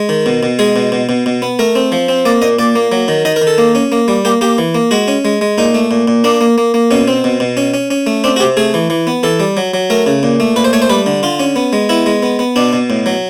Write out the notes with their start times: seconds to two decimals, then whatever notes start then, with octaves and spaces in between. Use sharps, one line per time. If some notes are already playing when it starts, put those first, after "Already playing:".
Already playing: G#3
0.09 D#3
0.26 B2
0.43 B2
0.59 G#3 G#4
0.76 B2
0.92 B2
1.09 B2
1.26 B2
1.42 B3
1.59 A3 A#4
1.75 C4
1.92 F3
2.09 C4
2.25 A#3 D5
2.42 A#2 D#5
2.59 A#2 D5
2.76 A#3
2.92 F#3
3.08 D#3
3.25 D#3 D#5
3.36 A#4
3.42 D#3
3.47 A4
3.58 A#3
3.75 C#4
3.92 A#3
4.08 G3
4.25 A#3 G4
4.41 A#3 G4
4.58 E3
4.75 A#3
4.91 G#3 F#4
5.08 C#4
5.25 G#3
5.41 G#3
5.58 A#2 D#4
5.74 A3
5.91 A#2
6.08 A#2
6.24 A#3 D4
6.41 A#3
6.58 A#3
6.74 A#3
6.91 B2 C#4
7.08 C4
7.24 B2
7.40 B2
7.57 C#4
7.74 C#4
7.91 C#4
8.07 A3
8.24 C4 D4
8.36 F#4
8.40 C3 G4
8.57 A3 G#4
8.74 E3
8.90 E3
9.07 B3
9.23 E3 A4
9.40 G3
9.57 F#3
9.74 F#3
9.90 A3 A#4
10.07 C#3
10.23 A#2
10.40 A3
10.56 A#2 B4
10.64 C5
10.73 A3 C#5
10.82 C5
10.90 G3 B4
11.06 D3
11.23 D3 F4
11.40 C#4
11.56 B3
11.73 G#3
11.89 B3 E4
12.06 G#3
12.23 B3
12.39 B3
12.56 B2 D4
12.73 B2
12.90 A2
13.06 F#3